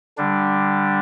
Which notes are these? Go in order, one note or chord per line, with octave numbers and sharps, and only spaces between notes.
D3 G3 D4